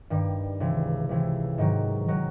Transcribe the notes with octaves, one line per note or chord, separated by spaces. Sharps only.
G2 D#3 G3
C#2 C3 E3
C#2 C3 E3
G#2 D#3 F#3
D#3 F#3